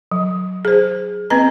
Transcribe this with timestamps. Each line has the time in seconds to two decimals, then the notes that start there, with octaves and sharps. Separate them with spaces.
0.12 F#3
0.65 G#4 C5
1.30 B3 C4 B4 D#5 A#5